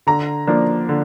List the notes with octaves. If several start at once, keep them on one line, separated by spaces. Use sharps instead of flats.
D3 A#5
F3 A#3 D4
D3